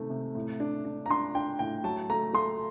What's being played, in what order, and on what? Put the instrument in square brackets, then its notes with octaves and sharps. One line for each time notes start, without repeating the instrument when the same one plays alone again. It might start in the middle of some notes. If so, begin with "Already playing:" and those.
Already playing: [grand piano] C3 D#3 A3
C3
A2
D4
D4
A#5
D4 C6
D4 G5
A2 G5
F#3 A5
A3 A#5
A3 C6